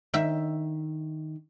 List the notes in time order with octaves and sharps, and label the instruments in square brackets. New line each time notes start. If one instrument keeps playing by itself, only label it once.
[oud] D#3 E5